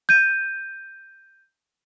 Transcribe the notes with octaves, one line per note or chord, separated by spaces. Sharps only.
G6 D#7